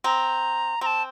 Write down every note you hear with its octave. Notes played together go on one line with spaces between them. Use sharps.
C4 A#5
C4 A5 A#5